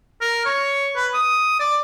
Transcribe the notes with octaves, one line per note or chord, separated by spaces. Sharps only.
A#4
C#5
B4
D#6
D5